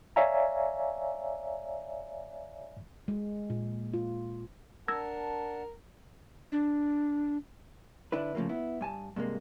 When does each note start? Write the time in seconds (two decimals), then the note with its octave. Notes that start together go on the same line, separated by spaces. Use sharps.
0.16 C#5 D5 E5 F5 G#5 A#5
3.08 G#3
3.50 A#2
3.94 F4
4.88 D4 A#4 F#5 A5 E6 G#6 A#6
6.52 D4
8.12 D3 D4 E4 B4
8.35 C#3 F3 F#3 A3 A#3
8.49 B3 E4
8.81 G2 G#5 A5
9.16 G2 C3 G#3 A#3